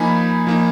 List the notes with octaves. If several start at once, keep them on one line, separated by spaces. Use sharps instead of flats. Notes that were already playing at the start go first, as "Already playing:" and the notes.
Already playing: F3 A#3 D#4 G#5 B5
F3 A#3 D#4